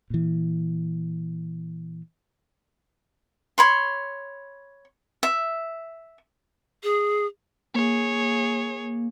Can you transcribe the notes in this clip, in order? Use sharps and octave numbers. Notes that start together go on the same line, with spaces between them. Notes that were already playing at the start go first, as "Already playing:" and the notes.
A#2 E3
C#5 B5 C6
E5
G#4
A#3 G#4 C#5